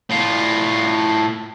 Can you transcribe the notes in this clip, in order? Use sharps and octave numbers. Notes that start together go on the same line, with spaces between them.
A2 F4